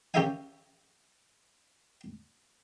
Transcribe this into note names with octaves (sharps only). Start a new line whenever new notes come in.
C#4 G4 A#4 E5 F5 G#5